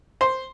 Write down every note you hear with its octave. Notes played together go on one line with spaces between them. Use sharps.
C5